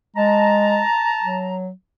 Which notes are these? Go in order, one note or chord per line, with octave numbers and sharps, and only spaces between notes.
G#3 A5 A#5
F#3